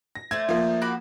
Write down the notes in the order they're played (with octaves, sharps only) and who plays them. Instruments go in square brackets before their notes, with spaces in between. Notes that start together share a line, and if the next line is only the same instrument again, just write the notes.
[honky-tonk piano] A#6
[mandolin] A3 C5 D5 [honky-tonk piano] G#6
[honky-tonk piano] F3 A#3
[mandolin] F#4 B5 D6